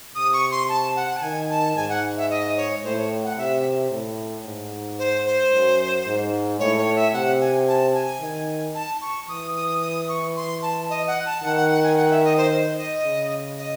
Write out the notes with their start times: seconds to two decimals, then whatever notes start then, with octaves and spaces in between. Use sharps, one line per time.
0.15 C3 D#6
0.33 C#6
0.51 C6
0.69 A5
0.96 F#5
1.17 A5
1.22 D#3 G#5
1.50 A5
1.76 G#2 G#5
1.90 F#5
2.17 E5
2.30 D#5
2.57 C#5
2.84 A2 C5
2.97 C#5
3.24 F#5
3.38 C3 E5
3.91 A2
4.45 G#2
4.99 C5
5.26 C5
5.53 F#2
6.07 G#2
6.59 A2 C#5
6.78 C#5
6.96 E5
7.14 C3 F#5
7.40 G#5
7.68 A5
7.94 G#5
8.20 D#3
8.75 A5
9.02 C#6
9.28 E3 D#6
9.56 D#6
9.82 D#6
10.09 C#6
10.36 C6
10.62 A5
10.89 D#5
11.07 F#5
11.26 A5
11.43 D#3 F#5
11.57 F#5
11.70 F#5
11.84 G#5
11.97 F#5
12.11 E5
12.24 D#5
12.37 C5
12.51 C5
12.77 D#5
13.05 C#3
13.58 D#5